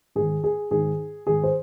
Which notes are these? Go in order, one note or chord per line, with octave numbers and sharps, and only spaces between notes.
G#2 D#3 G#4
G#4
G#2 D#3 G#4
G#2 D#3 G#4
C5